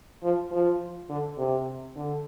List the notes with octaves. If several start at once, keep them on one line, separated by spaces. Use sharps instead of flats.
F3
F3
D3
C3
D3